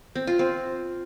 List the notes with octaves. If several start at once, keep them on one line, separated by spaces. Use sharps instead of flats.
C4
F4
C4